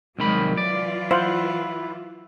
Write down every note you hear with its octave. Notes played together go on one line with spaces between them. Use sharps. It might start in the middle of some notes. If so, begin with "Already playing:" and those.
C2 D#3 F#3 G#3 A#3 B5
E3 F#3 F4 D5
E4 C5 F5 F#5